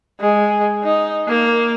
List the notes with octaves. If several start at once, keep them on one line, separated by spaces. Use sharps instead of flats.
G#3
D#4
A#3